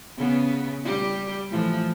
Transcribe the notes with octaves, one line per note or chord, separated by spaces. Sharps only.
C#3 B3
G3 G4
A2 E3 F3